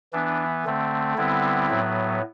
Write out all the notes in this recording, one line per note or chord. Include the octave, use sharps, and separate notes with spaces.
E3 B3 D4
D3 A3 C4
D3 G3 B3 C4 E4
A2 F#3 B3